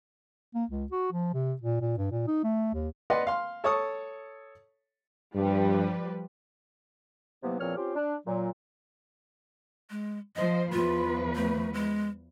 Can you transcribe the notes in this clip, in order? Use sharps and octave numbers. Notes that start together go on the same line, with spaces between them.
A#3
C#2
F#4
F3
C3
A#2
A#2
G2
A#2
D#4
A3
D#2
B4 D5 D#5 F#5 C6
F5 C6
A4 C#5 A5 C#6 D#6
G2 F3 G3 B4
C3 E3 F#3 A#3 B3
E2 A#2 F3 C4 C#5 F6
C4 C#4 F4 G4
D4
A#2 F#3
G#3
F3 C5 D#5
E2 F3 F4 B4
A3
G#3